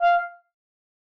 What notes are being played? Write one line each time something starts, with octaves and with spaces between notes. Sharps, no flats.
F5